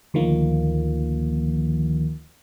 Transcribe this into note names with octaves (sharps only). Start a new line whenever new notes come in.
D2 D#3 F3 A#3